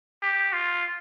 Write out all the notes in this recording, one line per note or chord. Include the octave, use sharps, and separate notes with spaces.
G4
F4